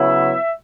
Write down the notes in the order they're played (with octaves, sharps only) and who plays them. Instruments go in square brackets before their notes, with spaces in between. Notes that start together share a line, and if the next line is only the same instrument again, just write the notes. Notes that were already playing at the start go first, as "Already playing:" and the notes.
Already playing: [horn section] C#3 F#3 B3 E4 E5